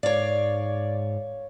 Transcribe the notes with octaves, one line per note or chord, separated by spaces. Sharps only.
G#2 C#5 D5 F5